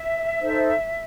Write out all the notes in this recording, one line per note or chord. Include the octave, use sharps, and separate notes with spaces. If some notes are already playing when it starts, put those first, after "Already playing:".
Already playing: E5
D#4 A4 C5